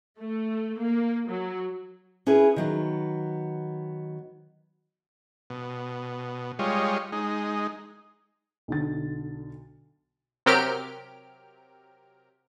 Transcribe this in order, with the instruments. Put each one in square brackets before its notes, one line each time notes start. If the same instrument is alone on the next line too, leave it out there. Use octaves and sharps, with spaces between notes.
[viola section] A3
A#3
F#3
[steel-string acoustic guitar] C#4 E4 G#4 B4
D#3 F#3 B3
[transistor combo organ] B2
G3 G#3 F4 C#5 D#5
G#3 D#4
[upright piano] B1 D3 A6
[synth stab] C3 F#3 G4 A#4 F6 D7